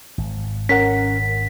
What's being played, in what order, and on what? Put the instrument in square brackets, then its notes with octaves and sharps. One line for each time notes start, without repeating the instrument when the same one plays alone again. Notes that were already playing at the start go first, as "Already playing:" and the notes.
[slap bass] G#1
[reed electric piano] C#4 A#4 F#5 [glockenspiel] B6